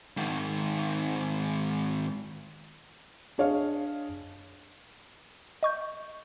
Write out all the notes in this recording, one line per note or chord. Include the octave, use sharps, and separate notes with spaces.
G#2 D#3
D4 G#4 C#5 D#5 F5
D#5 C#6 G6